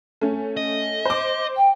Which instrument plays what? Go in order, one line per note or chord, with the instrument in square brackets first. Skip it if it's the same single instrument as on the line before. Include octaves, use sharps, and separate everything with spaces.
[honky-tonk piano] A3 C#4
[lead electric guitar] D#5
[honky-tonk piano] C5 D6
[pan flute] G5